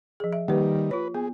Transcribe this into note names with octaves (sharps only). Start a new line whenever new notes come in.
F3 G#4
E5
D#3 G3 A#3 G4 B4
F4 B4 C#5
B3 G#4